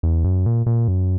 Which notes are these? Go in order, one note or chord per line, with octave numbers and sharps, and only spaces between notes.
E2
F#2
A#2
A#2
F#2